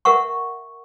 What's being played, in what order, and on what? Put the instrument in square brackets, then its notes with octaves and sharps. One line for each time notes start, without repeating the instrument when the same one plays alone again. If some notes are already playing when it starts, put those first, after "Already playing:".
[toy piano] A#4 E5 F#5 C#6